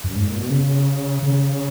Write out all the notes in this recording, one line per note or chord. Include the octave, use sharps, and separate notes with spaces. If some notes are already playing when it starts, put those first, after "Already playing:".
F#2
G#2
A#2
B2
C#3
C#3